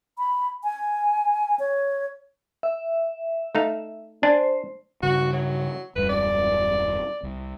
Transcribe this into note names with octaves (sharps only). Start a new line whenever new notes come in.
B5
G#5
C#5
E5
A3 D#4 F5
D4 C5 G#5
G2 C#3 F#4
F#3
D#1 F#2 G3 B4
D5
C2